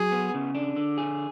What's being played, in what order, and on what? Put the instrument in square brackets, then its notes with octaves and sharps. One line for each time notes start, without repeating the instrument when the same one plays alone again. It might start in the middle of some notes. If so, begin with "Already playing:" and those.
Already playing: [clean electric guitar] F#3 [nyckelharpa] G#4
[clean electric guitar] B3
C#3
D4
D3
G#4